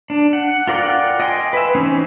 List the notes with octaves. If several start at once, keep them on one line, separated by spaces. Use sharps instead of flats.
D4
F#5
F4 A#4 D5 F#5 G5
D#5 G5 G#5 C6
B4 E5
E3 C4 C#4 D#4